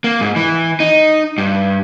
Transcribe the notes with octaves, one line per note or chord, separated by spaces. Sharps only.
A#3
G#2
E3
D#4
G2